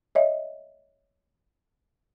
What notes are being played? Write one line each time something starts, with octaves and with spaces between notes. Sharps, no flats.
C#5 D#5 E5